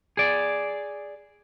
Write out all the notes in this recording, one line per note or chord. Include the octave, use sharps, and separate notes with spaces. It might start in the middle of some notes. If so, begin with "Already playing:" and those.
G#4 D5